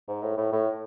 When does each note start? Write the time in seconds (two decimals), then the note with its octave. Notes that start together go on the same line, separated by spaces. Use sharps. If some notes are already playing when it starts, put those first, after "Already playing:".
0.08 G#2
0.23 A2
0.38 A2
0.52 A2